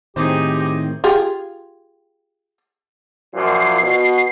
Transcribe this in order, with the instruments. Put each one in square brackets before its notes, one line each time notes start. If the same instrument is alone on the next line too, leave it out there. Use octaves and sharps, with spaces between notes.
[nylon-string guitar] A2 D#3 [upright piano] C4 C5 [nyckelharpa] D#4 G#4 [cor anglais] G4
[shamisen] F4 G4 G#4
[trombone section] F#2 A#2 F3 [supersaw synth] C7
[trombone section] B2